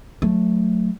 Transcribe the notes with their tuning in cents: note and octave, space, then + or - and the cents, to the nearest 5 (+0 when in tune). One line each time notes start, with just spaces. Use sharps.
F#3 -15 A3 +0